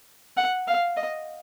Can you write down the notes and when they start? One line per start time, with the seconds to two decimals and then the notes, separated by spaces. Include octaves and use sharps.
0.37 F#5
0.67 F5
0.97 D#5